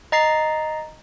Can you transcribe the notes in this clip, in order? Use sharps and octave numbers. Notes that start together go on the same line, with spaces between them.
D#5 A#5 A6 C7